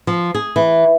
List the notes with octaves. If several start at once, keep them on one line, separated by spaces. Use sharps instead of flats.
F3
G#4
E3